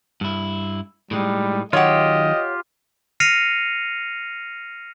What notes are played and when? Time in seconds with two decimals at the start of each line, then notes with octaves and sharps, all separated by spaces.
0.21 G2 E4
1.11 A2 G3 G#3 D#4
1.73 D#3 F#3 F4 G4 C#5 D#5 F#5
3.20 F6 A#6 C7 C#7 D#7 F7